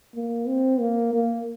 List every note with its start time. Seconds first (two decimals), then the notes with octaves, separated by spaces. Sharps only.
0.15 A#3
0.48 C4
0.80 A#3
1.14 A#3